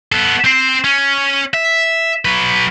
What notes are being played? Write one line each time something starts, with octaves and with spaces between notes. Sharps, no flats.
B3 A4
C4 C5
C#4
E5
F#3 B4